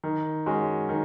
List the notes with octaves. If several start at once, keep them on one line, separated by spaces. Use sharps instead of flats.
D#3
G#3 C#4 F#4
D#3